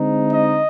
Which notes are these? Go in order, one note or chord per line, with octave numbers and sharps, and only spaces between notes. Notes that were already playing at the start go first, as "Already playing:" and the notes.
Already playing: D3 G#3 C4 D#4
D#5